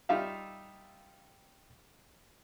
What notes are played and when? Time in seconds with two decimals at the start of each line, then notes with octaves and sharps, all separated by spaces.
0.09 G3 D#4 F4 G4 E5 F5